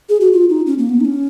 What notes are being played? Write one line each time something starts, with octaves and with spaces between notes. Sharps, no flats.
G#4
F#4
F4
D#4
C#4
A#3
B3
D#4
C#4